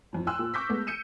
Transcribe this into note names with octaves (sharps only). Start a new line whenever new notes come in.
F2 A2
G5 G#5 C6 E6 F#6
A#2
C#6 D6 E6 G6 A#6 B6
G#3 A3 B3
G6 C#7 D#7 E7